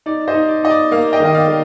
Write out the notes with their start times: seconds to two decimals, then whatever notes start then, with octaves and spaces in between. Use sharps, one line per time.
0.06 D#4 D5
0.28 C5 D#5
0.35 D#4
0.49 D5
0.63 D#4 D#5
0.70 D5
0.91 A#3 D5 F5
1.13 D#5 G5
1.20 D#3
1.25 D#5
1.34 D5 F5
1.48 D#3